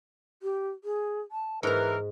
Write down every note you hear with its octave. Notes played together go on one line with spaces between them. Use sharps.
G4
G#4
A5
G#2 E3 E4 A#4 B4 A#5